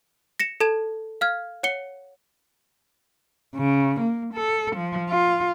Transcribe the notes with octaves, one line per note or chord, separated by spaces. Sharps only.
A#6 C#7 E7
A4 A5 G#6 E7
F5 F6 G#6
C#5 F#5 C#7 G7
C#3
A#3
A4
F3
F4